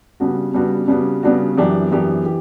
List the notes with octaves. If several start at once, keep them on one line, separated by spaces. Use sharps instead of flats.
C#3 G3 B3 D4 F#4
C#3 G3 B3 D4 F#4
C#3 G3 B3 D4 F#4
C#3 G3 B3 D4 F#4
F#2 E3 B3 D4 G4
F#2 E3 B3 D4 G4
E3 G4